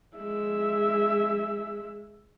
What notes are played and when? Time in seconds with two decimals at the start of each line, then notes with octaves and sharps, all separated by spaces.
0.17 G#3 E5